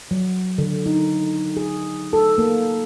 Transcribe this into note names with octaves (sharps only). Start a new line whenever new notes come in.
F#3
D3
D#4
G#4
A4
A#3